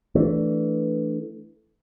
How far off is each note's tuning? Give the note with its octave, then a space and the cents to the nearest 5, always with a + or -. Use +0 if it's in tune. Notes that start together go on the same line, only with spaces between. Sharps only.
E3 +0 A3 +0 D4 +0